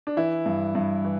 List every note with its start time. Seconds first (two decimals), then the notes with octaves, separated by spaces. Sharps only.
0.07 D4
0.17 E3 E4
0.46 G2
0.75 G2
1.05 E3